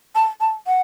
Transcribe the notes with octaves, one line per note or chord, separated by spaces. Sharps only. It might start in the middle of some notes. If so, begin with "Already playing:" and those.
A5
A5
F#5